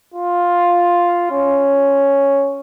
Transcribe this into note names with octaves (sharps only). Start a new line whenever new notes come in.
F4
C#4